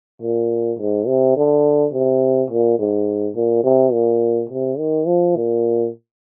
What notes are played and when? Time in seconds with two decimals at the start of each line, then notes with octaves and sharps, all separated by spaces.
0.22 A#2
0.79 G#2
1.07 C3
1.37 D3
1.93 C3
2.50 A#2
2.79 G#2
3.36 A#2
3.64 C3
3.92 A#2
4.49 C3
4.78 D#3
5.07 F3
5.36 A#2